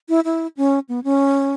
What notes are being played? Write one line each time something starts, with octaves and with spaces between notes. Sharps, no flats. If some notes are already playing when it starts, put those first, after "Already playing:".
E4
E4
C#4
B3
C#4